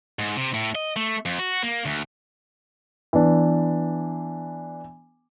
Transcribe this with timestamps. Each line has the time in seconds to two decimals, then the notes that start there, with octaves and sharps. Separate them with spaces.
0.19 G#2
0.37 C3
0.54 A2
0.75 D#5
0.96 A3
1.26 F2
1.39 F#4
1.63 A#3
1.85 D2
3.13 E3 B3 D4